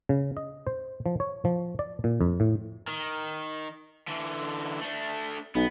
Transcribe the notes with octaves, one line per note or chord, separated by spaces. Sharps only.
C#3
D#5
C5
F3
C#5
F3
D5
A#2
F2
A2
D#3
D3 E3
A3 D4
B1 B3